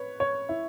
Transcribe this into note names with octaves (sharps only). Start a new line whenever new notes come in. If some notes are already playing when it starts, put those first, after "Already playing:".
Already playing: B4 C#5
C#5
E4